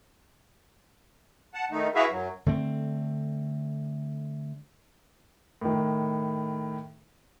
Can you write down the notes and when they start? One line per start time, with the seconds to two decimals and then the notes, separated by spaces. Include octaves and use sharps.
1.54 F#5 A5
1.71 D#3 A3 D#4
1.95 E4 F#4 G#4 B4 E5 F5
2.11 F#2 F#3
2.46 D3 A3 C4
5.61 A2 D#3